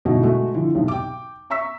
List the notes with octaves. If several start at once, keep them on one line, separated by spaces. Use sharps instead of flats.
G2 B2 D3 F#3 D#4 E4
G#3 A3 F#4
D3 E3 F3
B1 G#2 C3
G5 D6
E5 A#5 C#6 E6 B6